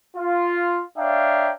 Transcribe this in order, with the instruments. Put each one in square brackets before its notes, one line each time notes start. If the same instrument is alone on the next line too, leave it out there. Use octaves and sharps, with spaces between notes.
[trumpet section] F4
D4 C#5 E5 F5 G5 A#5